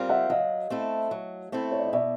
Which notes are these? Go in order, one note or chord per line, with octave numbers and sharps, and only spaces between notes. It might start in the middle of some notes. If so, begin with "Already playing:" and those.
Already playing: G3 C4 F4 A#4
E5 F#5
F#3 D#5 F5
A3 C4 E4 A4
F#3
A3 C4 E4 A4
C#5
D5
D#5
B2 D5 E5